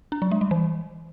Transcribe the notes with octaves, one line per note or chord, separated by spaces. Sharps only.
D4
F#3
G#3
G3
E3